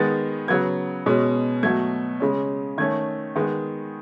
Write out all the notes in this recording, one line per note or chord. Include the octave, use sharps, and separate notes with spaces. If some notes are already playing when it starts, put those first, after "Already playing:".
Already playing: D#3 G#3 B3 A6
C#3 F#3 B3 G#6
B2 G#3 C#4
B2 F#3 A3 G#6
C#3 G#3 C#4
D#3 A3 C#4 G#6
D#3 G#3 B3